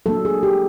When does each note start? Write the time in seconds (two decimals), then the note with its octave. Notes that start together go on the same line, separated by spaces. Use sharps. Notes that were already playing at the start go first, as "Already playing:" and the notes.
0.06 F#3 A#3 D4 A4
0.25 G#4
0.43 G4